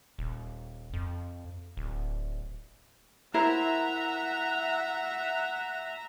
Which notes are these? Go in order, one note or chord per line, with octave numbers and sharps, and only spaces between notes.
D#1
F2
D1
E4 A#4 C5 E5 F#5 A#5